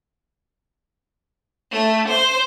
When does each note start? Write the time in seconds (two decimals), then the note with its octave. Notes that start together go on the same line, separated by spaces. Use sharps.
1.72 A3
2.08 C5